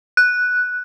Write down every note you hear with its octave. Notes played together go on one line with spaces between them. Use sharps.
F#6